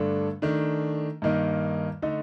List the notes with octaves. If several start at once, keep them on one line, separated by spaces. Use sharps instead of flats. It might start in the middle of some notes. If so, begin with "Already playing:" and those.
Already playing: G2 D3 A3 D4
D#3 A3 D4
G2 D#3 A#3 D#4
D3 A3 D#4